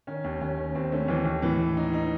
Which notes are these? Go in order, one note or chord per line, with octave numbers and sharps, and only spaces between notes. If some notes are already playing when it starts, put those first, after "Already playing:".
D#3 C#4
D#2
D#2 C#4
D#3
D#2 C4
A3 C#4
D#2 E3
D#2
A2 E3
A2
D#4
D#4